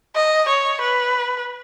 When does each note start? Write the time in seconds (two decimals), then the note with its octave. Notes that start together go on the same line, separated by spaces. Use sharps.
0.15 D#5
0.49 C#5
0.81 B4